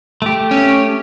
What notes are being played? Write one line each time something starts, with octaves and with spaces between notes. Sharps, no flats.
A3 G4
C#4